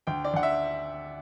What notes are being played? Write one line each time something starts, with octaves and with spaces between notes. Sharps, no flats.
D2 G5
D5
D2 F#5
E5